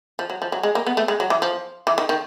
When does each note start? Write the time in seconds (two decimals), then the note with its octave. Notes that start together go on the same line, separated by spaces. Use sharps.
0.19 F3
0.30 F#3
0.42 F3
0.52 F#3
0.63 G#3
0.75 A#3
0.87 B3
0.97 A3
1.08 G#3
1.20 F#3
1.30 E3
1.42 F3
1.87 E3
1.98 D#3
2.09 D#3